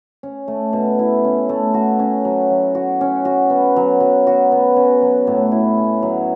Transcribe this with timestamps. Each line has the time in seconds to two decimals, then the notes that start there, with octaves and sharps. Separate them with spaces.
0.23 C#4
0.48 A3
0.73 B2
0.99 E4
1.24 C#4
1.49 A3
1.74 F#4
1.99 C#4
2.25 F#3
2.50 F#3
2.75 F#4
3.01 C#4
3.25 F#4
3.50 B3
3.76 F#3
4.00 F#3
4.27 F#4
4.52 B3
4.76 C#4
5.02 F#3
5.27 A2
5.52 E4
5.77 C#4
6.03 F#3